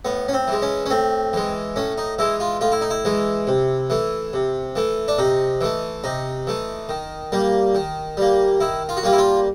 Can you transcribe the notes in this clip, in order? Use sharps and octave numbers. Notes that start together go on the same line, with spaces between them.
A2 B3
C#4
C4
E3 G#3
C#4
C#4
A2 C4
E3 G#3
A2 C#4
D#4
E3 G#3 E4
F4
A2 F4
E4
D#4
E4
E3 G#3
C3
E3 A3
C3
E3 A3
D4
C3 D#4
E3 A3
C3 D#4
E3 A3
D#3
G3 A#3
D#3
G3 A#3
D#3 E4
F4
F#4
G3 A#3 F4
E4
F4